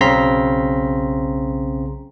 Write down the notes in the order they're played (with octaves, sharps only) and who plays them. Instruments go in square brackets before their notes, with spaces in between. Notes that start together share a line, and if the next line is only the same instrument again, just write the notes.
[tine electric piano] B1 C#3 C4 A#5 C6 B6